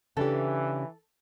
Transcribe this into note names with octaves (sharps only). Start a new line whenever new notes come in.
C#3 E3 D4 G4 A4